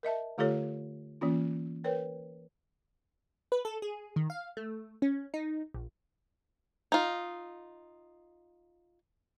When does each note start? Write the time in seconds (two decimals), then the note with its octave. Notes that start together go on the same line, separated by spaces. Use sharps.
0.03 A#4 D#5 E5 A5
0.38 D3 A3 F4 G4 A4 C#5
1.21 E3 A#3 C#4 F4
1.84 A#4 B4 C#5 G5
3.52 B4
3.65 A4
3.82 G#4
4.16 D#3
4.30 F5
4.57 A3
5.02 C#4
5.34 D#4
5.74 A#1
6.92 D#4 F4